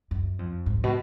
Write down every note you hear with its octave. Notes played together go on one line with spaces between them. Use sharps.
F#2
F2
G#2
B2